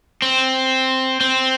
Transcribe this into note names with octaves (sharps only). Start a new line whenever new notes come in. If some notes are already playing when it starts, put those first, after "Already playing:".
C4
C4